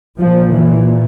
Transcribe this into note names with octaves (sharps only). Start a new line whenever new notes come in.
A#2 F3
E3